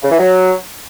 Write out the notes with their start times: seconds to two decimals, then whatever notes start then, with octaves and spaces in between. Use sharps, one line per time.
0.03 C#3
0.11 E3
0.19 F#3